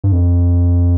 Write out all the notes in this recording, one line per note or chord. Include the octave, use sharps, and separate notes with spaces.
G2
F2